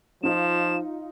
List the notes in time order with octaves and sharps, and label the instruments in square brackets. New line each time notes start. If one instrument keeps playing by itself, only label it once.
[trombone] F3 [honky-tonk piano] D#4 F4 [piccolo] E7